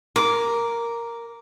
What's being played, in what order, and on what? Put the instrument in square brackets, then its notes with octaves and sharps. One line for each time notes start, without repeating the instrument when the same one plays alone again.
[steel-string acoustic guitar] A#4 [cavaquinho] D6